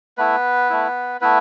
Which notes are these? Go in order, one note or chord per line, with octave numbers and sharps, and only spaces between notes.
A3 B3 E4 B4
A3 E4
A3 B3 E4 B4